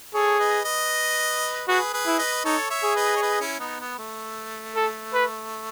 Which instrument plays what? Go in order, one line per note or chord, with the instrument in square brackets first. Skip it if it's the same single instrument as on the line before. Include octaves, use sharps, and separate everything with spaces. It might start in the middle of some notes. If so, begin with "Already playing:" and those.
[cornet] G#4 [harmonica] A4 C#5
[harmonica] B4 D#5
B4 D#5
[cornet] F#4 [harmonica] G#4 B4
[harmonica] G#4 B4
[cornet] E4
[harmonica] B4 D#5
[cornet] D#4 [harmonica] A4 C#5
[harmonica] C#5 E5
[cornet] G#4
[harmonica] B4 D#5
C#5
B4 D#5
C#4 E4
B3 D#4
B3
A3
[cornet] A4
B4